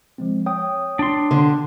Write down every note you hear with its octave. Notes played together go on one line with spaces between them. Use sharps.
F3 G#3 C4
C#5 G5 D#6
D4 C6
D3